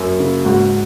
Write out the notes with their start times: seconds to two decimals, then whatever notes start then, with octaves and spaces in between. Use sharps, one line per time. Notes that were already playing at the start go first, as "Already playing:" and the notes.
Already playing: F#2
0.20 C#3
0.45 G#2 F#4 F#5